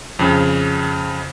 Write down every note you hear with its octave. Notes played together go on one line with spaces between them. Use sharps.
F2 C#3